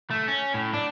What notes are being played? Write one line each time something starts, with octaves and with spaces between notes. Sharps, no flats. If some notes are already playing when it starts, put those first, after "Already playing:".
A3
C#4
A2
D4